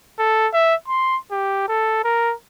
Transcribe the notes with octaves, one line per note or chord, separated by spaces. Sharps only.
A4
E5
C6
G4
A4
A#4